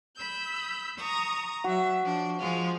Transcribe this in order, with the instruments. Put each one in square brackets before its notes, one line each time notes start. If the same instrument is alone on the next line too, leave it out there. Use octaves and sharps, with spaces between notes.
[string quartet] B5 E6 G6
A#5 C#6 D#6
[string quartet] F#3 E5 [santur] F#4
[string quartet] F3 D4
F3 G#3 F4